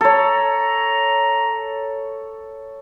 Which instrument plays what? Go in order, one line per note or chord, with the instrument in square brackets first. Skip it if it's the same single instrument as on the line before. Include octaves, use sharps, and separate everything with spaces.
[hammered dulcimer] A4 C#5 [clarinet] A#5